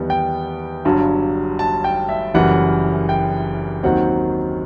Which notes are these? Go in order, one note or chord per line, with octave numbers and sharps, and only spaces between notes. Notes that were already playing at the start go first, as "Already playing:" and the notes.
Already playing: E2 D#3 G3 B3
G5
G1 G2 F#3
A5
G5
E5
F#1 F#2 E3 G3 F#5
G5
D#2 D#3 F#3 C4 F#5